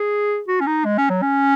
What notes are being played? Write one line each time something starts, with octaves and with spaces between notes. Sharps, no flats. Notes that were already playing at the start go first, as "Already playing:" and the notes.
Already playing: G#4
F#4
C#4
D#4
G#3
C#4
F#3
C#4